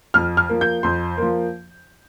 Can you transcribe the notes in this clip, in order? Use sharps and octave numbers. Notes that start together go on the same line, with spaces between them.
F2 F6
F6
F3 A#3
G6
F2 C6
F3 A#3